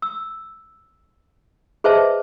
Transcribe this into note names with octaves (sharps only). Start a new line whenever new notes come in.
E6
G#4 B4 C5 D#5 E5 A5